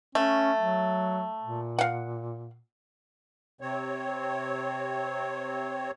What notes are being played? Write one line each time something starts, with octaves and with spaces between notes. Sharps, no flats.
A3 C#4
F#3
A#2
F5 F#5
C3 C4 C#5